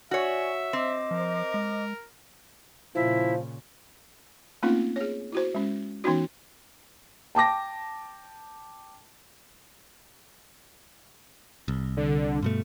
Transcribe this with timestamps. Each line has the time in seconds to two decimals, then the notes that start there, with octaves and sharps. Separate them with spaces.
0.11 F#4 C#5 D5 E5 G#5
0.73 C4 C5 D#5 D6
1.11 F3 A#4
1.54 G#3
2.95 A#2 C#3 F3 E4
4.63 A3 A#3 C4 C#4 D#4 F4
4.96 G#4 C#5
5.32 E4 F#4 C5
5.55 G#3 C#4
6.04 E3 B3 C#4 D#4 F#4
7.35 G5 A5 D6 A#6
11.68 C2
11.97 D3
12.43 G2 B2 A3